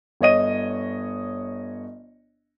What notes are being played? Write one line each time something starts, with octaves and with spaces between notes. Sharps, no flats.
G1 C#5 D#5 D#7